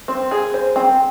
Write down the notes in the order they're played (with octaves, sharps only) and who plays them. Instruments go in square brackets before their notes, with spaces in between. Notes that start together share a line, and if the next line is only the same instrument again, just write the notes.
[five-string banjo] C4
G#4
C5
C4